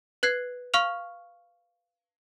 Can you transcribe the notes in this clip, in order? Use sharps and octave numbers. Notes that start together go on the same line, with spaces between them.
B4 F#6 G#6 C7
F5 C#6 F6 F7